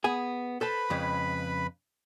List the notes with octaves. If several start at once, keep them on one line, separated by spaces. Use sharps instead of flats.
B3 G#4 G#5
A4 B4 C5 A5 B5
F2 C#3 G#3